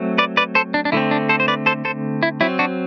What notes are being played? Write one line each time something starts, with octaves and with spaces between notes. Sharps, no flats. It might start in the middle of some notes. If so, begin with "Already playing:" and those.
Already playing: F#3 A3 C4
B4 D5
B4 D5
A4 C5
D4
D4
D3 A3 C4 E4
D4
A4 C5
C5
B4 D5
A4 C5
A4 C5
E4
F#3 C4 E4
D4 F#4